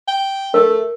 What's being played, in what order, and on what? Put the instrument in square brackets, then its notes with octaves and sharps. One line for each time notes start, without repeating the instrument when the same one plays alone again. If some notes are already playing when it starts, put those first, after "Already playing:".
[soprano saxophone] G5
[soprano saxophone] A3 [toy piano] A#4